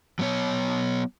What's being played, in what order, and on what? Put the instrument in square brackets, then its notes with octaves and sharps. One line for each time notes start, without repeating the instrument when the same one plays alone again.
[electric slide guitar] F#3 B3 C#5